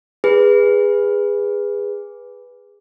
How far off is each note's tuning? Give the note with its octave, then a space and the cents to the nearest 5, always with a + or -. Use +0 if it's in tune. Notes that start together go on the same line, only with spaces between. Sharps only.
G#4 -20 B4 -5